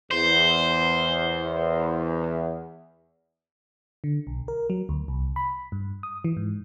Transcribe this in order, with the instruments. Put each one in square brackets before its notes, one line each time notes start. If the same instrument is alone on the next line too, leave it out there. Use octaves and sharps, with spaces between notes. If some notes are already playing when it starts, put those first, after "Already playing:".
[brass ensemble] E2 [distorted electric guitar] C5
[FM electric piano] D3
B1
A#4
F#3
D2
C2
B5
G2
D#6
E3
G#2